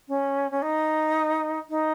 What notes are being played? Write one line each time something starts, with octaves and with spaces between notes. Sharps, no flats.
C#4
C#4
D#4
D#4